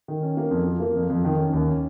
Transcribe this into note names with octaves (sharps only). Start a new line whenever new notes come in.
D#3
C#4
A#3
F2
F3
A#3
F2
F2
D#3
C#4
D#2
C#4